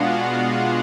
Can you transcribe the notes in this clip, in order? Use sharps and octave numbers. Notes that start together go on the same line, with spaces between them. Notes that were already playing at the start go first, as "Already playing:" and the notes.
Already playing: B2 G#3 B3 D4 F4 F#4 F5 F#5